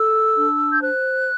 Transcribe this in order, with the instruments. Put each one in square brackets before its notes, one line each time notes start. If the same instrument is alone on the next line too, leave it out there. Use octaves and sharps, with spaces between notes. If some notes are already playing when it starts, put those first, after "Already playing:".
Already playing: [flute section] A4 E6
D4
G6
C5 F#6